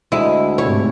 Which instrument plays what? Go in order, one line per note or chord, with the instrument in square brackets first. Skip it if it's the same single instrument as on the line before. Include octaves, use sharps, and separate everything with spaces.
[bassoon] D2 [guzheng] G#3 [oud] E4
[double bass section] G#2 C3 A3 [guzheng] E4 [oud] C#5